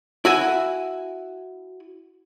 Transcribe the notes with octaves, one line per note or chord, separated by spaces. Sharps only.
E4 F#4 G#5